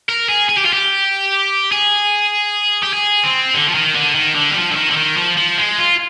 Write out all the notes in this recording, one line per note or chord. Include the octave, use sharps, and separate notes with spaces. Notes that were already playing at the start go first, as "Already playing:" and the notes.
A#4
G#4
G#4
G4
F4
G4
G#4
G4
G#4
C4
D3
F3
D#3
D3
D#3
D3
G3
F3
D3
D#3
D3
D#3
F3
F3
G#3
F4